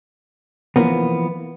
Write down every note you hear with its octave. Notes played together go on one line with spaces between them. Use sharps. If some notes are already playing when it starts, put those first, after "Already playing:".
E3 F3 A#3 B3